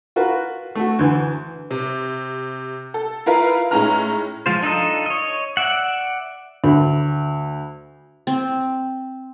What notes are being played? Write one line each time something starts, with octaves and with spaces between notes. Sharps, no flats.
F4 F#4 A#4 B4
A3 F#4
D2 E3
C3
A4
E4 F4 A#4 B4 F5
A2 G#3 C#4 D#4 A#5 F6
F3 G#3 F4 C5
D4 D#4 F4 A4 D#5
C#5 D#5
D5 E5 F#5
D2
C4